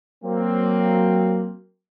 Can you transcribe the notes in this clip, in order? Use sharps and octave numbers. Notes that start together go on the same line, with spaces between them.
F#3 A#3 C4